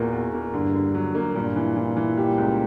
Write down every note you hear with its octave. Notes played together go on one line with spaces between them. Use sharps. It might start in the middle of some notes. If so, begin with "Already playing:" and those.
Already playing: E2 A#2 A#3 F#4
E2
A#3
G2 D3
D3
F#3
A#3
G2 A#2
E3
E3
E3
G3
C#2